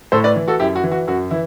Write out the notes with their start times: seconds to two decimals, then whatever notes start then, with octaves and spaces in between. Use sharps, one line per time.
0.12 A2 A4 C5
0.24 B4 D5
0.36 E3
0.48 F#4 A4
0.60 F#2 E4 G4
0.76 F#4
0.84 E3
0.91 F#4
1.07 F#2 F#4
1.31 E3 E4